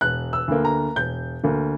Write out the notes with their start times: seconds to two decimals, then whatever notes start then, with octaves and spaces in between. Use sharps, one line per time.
0.01 E1 F#6
0.33 E6
0.48 D2 D3 A#3
0.65 A#5
0.96 E1 G6
1.43 D2 D3 A#3